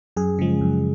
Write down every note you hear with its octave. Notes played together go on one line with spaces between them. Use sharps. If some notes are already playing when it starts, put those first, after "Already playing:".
F#2 G#4
C#3 F3 G#3
F#2